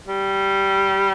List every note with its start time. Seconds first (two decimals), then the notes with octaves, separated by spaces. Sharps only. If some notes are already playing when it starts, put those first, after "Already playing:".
0.08 G3